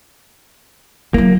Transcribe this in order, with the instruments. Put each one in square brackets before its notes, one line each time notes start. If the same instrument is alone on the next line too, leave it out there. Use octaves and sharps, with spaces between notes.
[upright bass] F#3 E4 [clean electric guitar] A#3